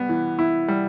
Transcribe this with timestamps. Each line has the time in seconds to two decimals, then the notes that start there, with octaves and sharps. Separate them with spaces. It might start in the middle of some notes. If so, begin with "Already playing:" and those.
Already playing: G3 B3
0.09 E3
0.39 E4
0.68 G3